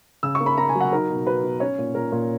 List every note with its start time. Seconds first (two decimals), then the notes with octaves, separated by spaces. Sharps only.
0.23 C#3 E6
0.35 C#6
0.41 A#3
0.46 B5
0.57 A#3 A#5
0.69 G#5
0.75 F#3
0.80 F#5
0.92 D#4 A#4
1.10 B2
1.27 B2 B4
1.44 B2
1.60 C#4 C#5
1.79 A#2
1.95 A#2 A#4
2.12 A#2